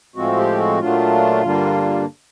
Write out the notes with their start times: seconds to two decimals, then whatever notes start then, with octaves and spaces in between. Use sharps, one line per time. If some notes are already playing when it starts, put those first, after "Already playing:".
0.16 A2 F3 G#3 C4 F#4
0.37 G4
0.58 F#4
0.79 A#2 F#3 A3 D4 F4
1.42 G2 D3 G3 A#3 D4